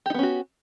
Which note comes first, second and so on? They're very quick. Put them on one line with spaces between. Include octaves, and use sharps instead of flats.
G4 D#4 B3 C#4 F#4